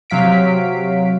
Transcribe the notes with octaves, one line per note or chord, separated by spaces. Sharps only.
C3 F#3 F5 B6 D7